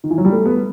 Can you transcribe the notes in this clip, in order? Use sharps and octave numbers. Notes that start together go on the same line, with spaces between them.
D#3
E3
F#3
G3
A3
B3